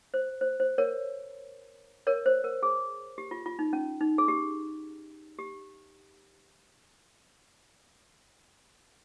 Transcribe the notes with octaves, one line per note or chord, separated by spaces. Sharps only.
C5
C5
C5
A#4 C#5
A#4 C#5
C5
A#4
G#4
G4
F4
F4
D#4
C#4
D#4
G#4
G4
G4